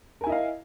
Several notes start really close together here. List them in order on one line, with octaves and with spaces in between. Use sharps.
A#4 G#5 E4 D#5 F5